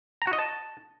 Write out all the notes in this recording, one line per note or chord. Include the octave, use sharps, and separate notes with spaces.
A#5
F#4
D#5
A5